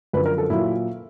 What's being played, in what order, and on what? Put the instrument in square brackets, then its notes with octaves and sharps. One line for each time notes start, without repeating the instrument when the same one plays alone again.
[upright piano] F#2 D3 F3 B4
A#4
A4
A#2 F#3 E4